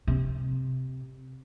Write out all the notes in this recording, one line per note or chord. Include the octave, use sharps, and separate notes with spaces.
C3